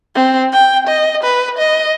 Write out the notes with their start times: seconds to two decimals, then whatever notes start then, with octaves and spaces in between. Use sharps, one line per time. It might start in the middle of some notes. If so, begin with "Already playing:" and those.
0.15 C4
0.52 G5
0.87 D#5
1.23 B4
1.58 D#5